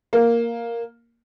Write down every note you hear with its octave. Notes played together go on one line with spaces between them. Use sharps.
A#3